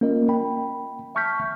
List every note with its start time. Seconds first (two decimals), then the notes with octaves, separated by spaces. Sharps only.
0.01 A#3 C#4 F4 A#4 D#5
0.29 G5 B5
1.15 E5 A5 C#6 F6 G6 B6